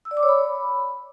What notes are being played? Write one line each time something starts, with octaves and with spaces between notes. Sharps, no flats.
E6
D5
D6
C#5
B5